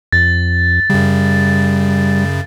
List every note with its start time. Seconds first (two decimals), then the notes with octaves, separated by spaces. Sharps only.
0.13 F2 A6
0.90 F#2 C#3 G3